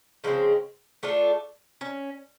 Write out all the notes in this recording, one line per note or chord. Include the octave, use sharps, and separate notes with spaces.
C#3 F3 G#3 C4
A3 D4 F4 A4
C#4